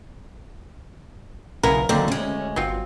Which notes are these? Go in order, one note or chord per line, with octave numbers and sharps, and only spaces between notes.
B1 C#3 B3 E4 A#4
D#2 D3 F#3 C4
D2 G#3 C#4
G1 F#3 C4 F4